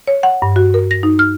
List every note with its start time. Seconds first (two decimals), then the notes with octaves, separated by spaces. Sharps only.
0.07 C#5
0.23 F#5
0.42 G2
0.56 F#4
0.74 A#4
0.91 A#6
1.03 D#4
1.19 F6